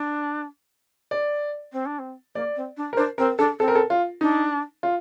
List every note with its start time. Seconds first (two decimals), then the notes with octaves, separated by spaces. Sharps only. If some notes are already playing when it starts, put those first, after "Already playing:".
Already playing: D4
1.11 D5
1.73 C4
1.86 D4
1.99 C4
2.35 A#3 D5
2.56 C4
2.77 D4
2.93 A#4
2.97 D4 C5
3.18 C4 A#4
3.38 D4 A4
3.60 C4 A4
3.68 A#4
3.75 A4
3.90 F4
4.21 D4 D#4
4.83 F4